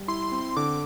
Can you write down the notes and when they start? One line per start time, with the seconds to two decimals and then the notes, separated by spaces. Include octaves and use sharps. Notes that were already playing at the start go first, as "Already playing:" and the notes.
Already playing: G3
0.08 E4 C6
0.32 C4
0.57 D3 D6